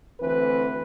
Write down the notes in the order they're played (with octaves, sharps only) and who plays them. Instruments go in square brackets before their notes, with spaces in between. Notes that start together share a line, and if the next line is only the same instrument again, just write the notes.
[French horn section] D2 E3 C4 B4